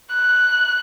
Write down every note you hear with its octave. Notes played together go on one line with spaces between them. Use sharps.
F#6